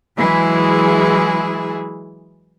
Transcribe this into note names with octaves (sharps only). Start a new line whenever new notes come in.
E3 F#3 G#3 E4 G#4